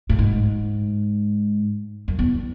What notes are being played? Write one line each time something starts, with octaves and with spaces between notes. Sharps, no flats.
A2
G#2
F#2
E2